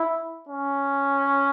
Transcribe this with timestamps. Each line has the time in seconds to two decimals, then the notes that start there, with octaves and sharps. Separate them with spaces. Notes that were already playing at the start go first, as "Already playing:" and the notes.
Already playing: E4
0.49 C#4